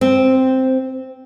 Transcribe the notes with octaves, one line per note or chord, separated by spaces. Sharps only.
C4